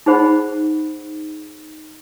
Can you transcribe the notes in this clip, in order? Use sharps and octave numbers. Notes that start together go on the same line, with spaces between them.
D#4 G#4 C5 F#5 B5